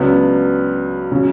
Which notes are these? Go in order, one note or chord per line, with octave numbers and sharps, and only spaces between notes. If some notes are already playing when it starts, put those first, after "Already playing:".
Already playing: C#2 C#3 F#3 B3 D4
C#3 F#3